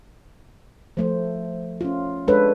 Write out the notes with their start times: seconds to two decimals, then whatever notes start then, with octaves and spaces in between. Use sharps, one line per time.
0.97 F3 A3 C5
1.81 C#4 F4
2.28 G#3 D4 A4 B4 C#5